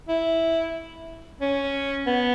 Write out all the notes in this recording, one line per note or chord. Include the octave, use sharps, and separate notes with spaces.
E4
C#4
B3